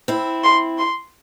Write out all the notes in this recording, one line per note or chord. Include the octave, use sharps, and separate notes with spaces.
C4 E4
C6
C6